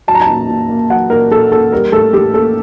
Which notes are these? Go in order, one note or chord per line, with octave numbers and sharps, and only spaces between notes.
F#3 A5
A#5
A5
A#2
A#2
A#3
F#3 F#5
A#2 A#4
A#2 A4
A#3 A4
G3 A#4
A2 A4
A2 G4
A#3 A4